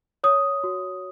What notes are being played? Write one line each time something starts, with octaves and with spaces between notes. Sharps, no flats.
C#5 D#6
F#4